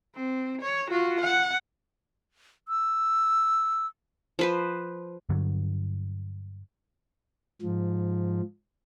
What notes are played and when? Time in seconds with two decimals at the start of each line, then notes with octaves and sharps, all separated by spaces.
0.16 C4
0.62 C#5
0.91 F4 F#4
1.21 F#5
2.68 E6
4.39 F3 B4 C5
5.29 G2 D3 F#3
7.62 G#2 F3